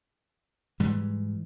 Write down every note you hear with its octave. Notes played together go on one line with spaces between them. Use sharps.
G#2 E3 G3